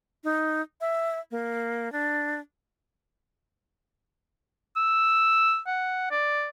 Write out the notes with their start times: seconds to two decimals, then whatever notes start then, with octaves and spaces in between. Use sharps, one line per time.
0.24 D#4
0.81 E5
1.31 A#3
1.92 D4
4.76 E6
5.67 F#5
6.11 D5